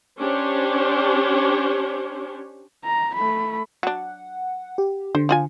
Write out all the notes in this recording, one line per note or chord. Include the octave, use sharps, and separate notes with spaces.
C#4 D4 G4 C5 C#5
A#5
A3 B5
F#3 D4 F#5
G4
D3 C5
F3 F4 G#5